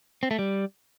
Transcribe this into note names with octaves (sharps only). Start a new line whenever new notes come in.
C4
A3
G3